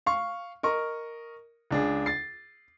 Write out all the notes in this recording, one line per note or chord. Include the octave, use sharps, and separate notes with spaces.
F5 C#6
A#4 D#5 C#6
C#2 D4 G#4
A6 C7